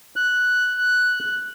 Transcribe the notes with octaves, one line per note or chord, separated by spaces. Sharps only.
F#6